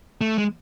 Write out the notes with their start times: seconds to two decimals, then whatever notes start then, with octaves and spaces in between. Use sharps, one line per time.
0.21 A3
0.38 G#3